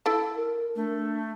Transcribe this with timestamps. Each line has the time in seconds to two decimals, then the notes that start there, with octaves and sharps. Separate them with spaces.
0.06 E4 A4 A5
0.35 A#4
0.76 A3 D4